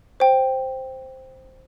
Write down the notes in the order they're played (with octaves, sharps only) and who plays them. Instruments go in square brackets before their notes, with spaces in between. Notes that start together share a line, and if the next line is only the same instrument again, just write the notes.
[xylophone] C5 G5